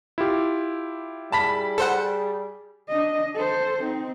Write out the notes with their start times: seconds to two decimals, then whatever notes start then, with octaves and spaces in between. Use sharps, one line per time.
0.18 E4 F4 G4
1.32 G3 G#4 A5 B5 B6
1.78 A4 C5 F#5
2.88 D4 D#5
3.35 A4 C5
3.83 C4 D#4